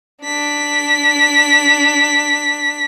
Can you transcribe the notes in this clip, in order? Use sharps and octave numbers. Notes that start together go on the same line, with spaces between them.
D4 B6